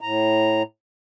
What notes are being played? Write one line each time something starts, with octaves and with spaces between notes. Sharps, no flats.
A2 A#5